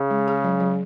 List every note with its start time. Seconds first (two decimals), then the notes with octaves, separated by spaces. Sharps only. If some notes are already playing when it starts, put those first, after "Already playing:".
Already playing: C#3
0.10 G#3
0.28 G#4
0.44 F#3
0.60 F#3